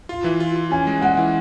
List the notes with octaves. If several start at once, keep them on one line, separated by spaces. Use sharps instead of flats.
F4
E3
F4
F4
C#4 G#5
G#3
G#3 F#5
E3